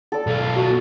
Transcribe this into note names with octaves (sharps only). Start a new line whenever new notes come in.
A4 D5
B1 F4
F#4